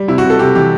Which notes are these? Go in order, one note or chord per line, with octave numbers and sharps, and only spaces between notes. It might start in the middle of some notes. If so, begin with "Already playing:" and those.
Already playing: G3
C3 E4
F#4
C3
A4
C3 G4
E3 G4